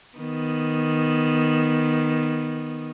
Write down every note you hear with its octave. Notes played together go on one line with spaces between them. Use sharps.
D#3 B3